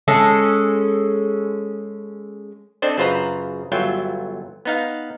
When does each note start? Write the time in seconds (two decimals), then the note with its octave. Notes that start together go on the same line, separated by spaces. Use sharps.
0.08 G#3 C#4 A4
2.82 C4 D4 A4 C5 D#5
2.98 F#2 C#3 F4 B4 C5 A#5
3.72 G1 F#3 F4 E5 G5
4.65 B3 D#4 F5